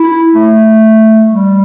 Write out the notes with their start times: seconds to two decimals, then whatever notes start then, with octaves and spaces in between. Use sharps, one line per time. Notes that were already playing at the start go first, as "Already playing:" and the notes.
Already playing: E4
0.35 A3
1.30 G3